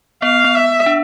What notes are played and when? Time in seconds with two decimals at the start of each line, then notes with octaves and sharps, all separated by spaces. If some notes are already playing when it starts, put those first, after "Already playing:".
0.22 B3 F5
0.44 B3
0.55 E5
0.86 D4